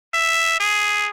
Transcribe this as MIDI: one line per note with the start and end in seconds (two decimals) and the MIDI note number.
0.14 0.56 76
0.60 1.08 68